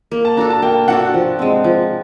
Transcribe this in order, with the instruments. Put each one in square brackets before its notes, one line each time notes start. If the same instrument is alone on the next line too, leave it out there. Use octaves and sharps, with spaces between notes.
[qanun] A#3
[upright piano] A5
[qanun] D4 F#4 A4 [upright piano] A#5
[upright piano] A5
[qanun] A#3 [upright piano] G5
[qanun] D4 F#4 A4 [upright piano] F#5
[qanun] F3
G#3 C4
F3